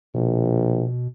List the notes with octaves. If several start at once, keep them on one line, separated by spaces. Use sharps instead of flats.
A#1 B2